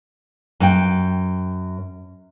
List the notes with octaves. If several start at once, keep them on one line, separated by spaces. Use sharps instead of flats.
F#2 G5